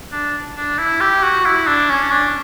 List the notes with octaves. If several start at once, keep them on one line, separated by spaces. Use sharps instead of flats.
D4
D4
E4
G4
F#4
E4
D4
C#4
D4